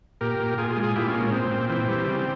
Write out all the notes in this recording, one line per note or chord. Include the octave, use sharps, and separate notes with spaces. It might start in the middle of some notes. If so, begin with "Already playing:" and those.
A#2 G4 A#4
A#2
A#2 F4 G#4
F4 G#4
G#3
F4 G#4
A#2 E4 G4
C#4 F4
G#3
A#3 C#4
A#2 C4
A#2
E3 C4
G3
C#3